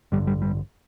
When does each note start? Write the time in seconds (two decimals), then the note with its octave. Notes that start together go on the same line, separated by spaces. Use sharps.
0.12 A1 G2 D3 G3
0.27 G3
0.42 G3